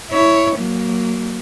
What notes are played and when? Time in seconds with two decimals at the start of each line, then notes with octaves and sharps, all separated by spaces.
0.11 E4 C#5
0.56 F#3 A#3